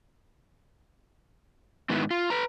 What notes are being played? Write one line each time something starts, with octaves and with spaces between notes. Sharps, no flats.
G#2 D#3 B3 E4
F4
B4 A#5